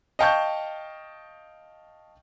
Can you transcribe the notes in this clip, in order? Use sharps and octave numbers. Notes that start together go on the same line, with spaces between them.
D#5 F5 G5 A5 C#6 G6